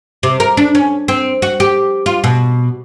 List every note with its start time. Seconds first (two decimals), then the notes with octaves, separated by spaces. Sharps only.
0.23 C3
0.40 A#4
0.57 D4
0.75 C#4
1.08 C4
1.42 F#4
1.60 G4
2.06 F4
2.24 B2